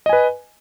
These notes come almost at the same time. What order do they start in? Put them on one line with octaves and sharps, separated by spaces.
D#5 G#5 B4